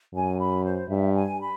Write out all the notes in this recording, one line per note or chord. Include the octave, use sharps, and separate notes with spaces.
F#2 G#5
B5
C5
G2 E5
G#5
B5